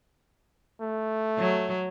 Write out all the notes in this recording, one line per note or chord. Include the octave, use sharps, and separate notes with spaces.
A3
F#3